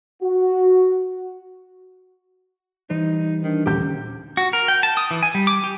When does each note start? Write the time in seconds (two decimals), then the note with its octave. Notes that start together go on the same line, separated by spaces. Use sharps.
0.22 F#4
2.90 E3 G3 D#4 C5
3.43 D#3 D4
3.66 D#1 C#4 G4 G6
4.37 F#4
4.53 A#4
4.68 G5
4.83 A5
4.97 D#6
5.11 E3
5.23 G#5
5.35 G3
5.47 D6
5.64 G4